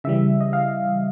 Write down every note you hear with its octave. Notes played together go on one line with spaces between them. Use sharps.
C#3 E3 G3 E5
D#5
F5